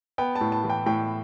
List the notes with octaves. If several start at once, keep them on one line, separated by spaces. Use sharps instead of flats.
B3 G5
A5
A2
A5
E3
G5
A2 G5